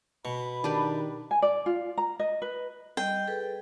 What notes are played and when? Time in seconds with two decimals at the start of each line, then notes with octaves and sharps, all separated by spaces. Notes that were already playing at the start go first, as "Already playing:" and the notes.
0.25 B2 B5 C#6
0.64 D#3 D4 G4 B4
1.31 G#5
1.42 D5
1.66 F4
1.98 A#5
2.19 D#5
2.42 B4
2.97 G3 D#5 G5
3.27 G#4 A4 B4